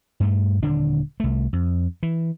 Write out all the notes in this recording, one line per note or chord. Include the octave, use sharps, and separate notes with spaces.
G2 A3
D#1 D3 D4
C2 A3
F2
E3